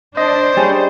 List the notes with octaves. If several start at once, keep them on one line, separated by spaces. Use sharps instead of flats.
D4 C5 D#5
G3 C#4 G#4